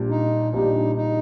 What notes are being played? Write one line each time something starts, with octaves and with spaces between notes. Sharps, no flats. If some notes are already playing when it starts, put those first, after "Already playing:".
Already playing: A#1 A#2 G3 D4 G4
D#4
A#1 A#2 G3 D4 D#4 G4
D#4